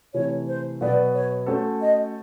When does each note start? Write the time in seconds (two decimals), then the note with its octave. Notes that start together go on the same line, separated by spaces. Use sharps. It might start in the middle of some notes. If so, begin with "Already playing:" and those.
0.14 C3 E3 A3 C#5
0.48 C5
0.81 B2 F#3 B3 D5
1.14 C#5
1.46 A3 C#4 F#4 A4 C5
1.80 D#5